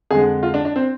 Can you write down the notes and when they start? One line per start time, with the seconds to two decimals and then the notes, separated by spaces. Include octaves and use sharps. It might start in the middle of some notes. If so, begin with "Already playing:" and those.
0.10 F2 D3 G#3 G#4
0.43 F4
0.54 D4
0.65 D4
0.76 C4